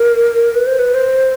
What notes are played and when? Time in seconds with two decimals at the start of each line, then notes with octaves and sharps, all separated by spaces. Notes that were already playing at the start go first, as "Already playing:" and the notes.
Already playing: A#4
0.55 B4
0.67 C5
0.79 B4
0.94 C5